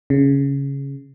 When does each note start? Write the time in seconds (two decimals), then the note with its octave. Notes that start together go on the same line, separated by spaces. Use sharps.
0.10 C#3